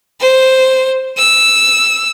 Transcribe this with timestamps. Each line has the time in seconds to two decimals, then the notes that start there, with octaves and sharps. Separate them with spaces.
0.21 C5
1.18 E6